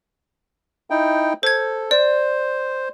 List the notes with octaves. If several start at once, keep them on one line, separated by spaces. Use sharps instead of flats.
D#4 E4 G5
A4 C5 G#6
C5 D5